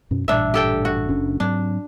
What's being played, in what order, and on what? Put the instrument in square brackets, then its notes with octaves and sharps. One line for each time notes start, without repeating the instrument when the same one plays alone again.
[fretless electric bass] F#2 B2 C#4
[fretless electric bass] A1 G2 A#2 [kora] D4 E5
[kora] G4 A4 G5
F#4
[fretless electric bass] F#1 C#4 D4
[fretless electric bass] G#2 F#3 C4 [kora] D4